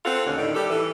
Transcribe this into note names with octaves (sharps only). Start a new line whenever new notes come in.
C4 F4 A4 F#5
D#2 B2 D3 C#4
A2 D3 D#3
G3 G4 A4
E3 A4